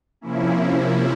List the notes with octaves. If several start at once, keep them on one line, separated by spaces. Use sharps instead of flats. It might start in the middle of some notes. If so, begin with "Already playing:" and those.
C3 F3 A#3 C#4 E4